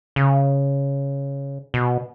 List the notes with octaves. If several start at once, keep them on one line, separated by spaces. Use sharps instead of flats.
C#3
B2